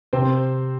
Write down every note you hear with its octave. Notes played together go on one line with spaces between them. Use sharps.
C3 C4 C5